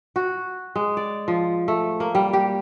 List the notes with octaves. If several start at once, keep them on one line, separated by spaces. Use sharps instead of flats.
F#4
G#3
D5
F3
A3
A#3
G3
G4